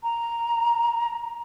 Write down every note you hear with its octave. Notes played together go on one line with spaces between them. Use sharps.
A#5